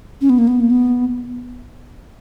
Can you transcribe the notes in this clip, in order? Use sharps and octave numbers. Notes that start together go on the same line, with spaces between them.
C#4
B3
A#3
B3
A#3
B3